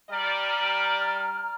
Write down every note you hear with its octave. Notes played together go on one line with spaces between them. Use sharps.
G3 D5 A#5 F6